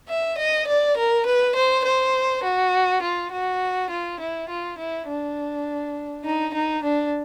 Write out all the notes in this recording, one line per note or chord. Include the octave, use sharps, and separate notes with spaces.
E5
D#5
D5
A#4
B4
C5
C5
F#4
F4
F#4
F4
E4
F4
E4
D4
D#4
D#4
D4